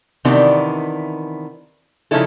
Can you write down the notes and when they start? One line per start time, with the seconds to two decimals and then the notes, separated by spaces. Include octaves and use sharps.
0.25 C3 D#3 E3 B3 D4
2.11 C#3 F3 C#4 D#4 E4 A4